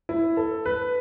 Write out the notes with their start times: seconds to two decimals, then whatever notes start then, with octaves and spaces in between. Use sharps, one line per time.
0.09 E4
0.37 A4
0.66 B4